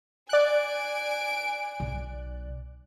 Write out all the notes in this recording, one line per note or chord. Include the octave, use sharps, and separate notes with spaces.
D5 G#5 F#6 D7
B1